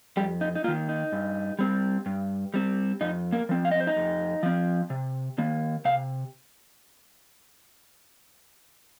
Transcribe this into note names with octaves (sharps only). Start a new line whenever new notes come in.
F2 G3 G4
D#4
D#4
D#3 A#3 F4
D#4
G2
G3 C4
G2
G3 C4
F2 D#4
A#3 A#4
F3 C4
F5
D#5
C5
D#4 D#5
F2
F3 C4
C3
D#3 A#3
C3 F5